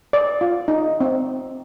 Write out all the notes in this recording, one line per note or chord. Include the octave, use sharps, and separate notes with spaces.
D5
F4
D#4
C4